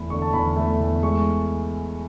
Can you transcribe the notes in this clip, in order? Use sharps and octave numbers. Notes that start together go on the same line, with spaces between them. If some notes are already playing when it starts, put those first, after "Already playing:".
Already playing: E2 A3 B5
D3 C#6
A5
E2 B5
A3
E2
G#3 C#6